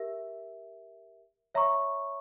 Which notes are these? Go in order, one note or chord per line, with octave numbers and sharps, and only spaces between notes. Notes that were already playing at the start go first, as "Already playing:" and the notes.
Already playing: G4 A#4 E5
C#5 E5 A#5 C#6